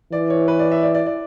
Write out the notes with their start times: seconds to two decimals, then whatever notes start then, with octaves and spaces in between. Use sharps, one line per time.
0.12 E3 D5
0.30 C#5
0.48 B4
0.59 D5
0.71 E5
0.83 D5
0.95 D5
1.07 D5